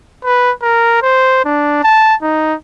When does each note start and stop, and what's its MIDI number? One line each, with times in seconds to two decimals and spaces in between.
0.25 0.51 71
0.63 0.98 70
1.03 1.42 72
1.45 1.83 62
1.83 2.15 81
2.22 2.54 63